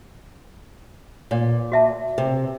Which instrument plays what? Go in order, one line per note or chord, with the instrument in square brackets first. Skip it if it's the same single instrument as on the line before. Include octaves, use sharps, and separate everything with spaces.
[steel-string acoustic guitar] A#2
[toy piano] F#4 E5 A5
[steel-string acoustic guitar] C3